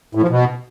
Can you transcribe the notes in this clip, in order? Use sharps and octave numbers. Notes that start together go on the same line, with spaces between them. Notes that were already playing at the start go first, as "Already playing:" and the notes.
A2
F3
B2